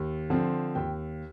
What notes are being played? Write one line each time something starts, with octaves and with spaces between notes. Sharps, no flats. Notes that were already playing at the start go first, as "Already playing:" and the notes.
Already playing: D#2
D3 F3 C4
D#2 G5